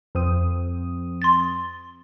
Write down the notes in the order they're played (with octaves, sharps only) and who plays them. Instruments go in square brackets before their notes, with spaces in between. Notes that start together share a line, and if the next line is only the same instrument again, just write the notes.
[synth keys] F2 C4 D#6
[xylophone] C6 A6